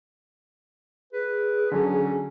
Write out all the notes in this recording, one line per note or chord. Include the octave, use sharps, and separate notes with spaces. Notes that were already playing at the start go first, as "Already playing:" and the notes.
G#4 B4
D3 F#3 C#4